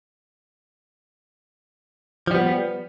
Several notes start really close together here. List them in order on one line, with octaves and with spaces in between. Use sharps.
F3 G3 B3